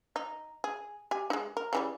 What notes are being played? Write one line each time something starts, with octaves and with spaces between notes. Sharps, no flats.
D#4
G#4
G4 G#5
G#3 D#4
A#4
C#3 E3 G3